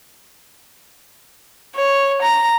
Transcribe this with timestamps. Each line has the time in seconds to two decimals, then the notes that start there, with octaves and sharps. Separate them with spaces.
1.75 C#5
2.22 A#5